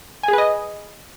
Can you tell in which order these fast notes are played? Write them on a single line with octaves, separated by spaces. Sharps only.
G#5 G#4 B4 D#5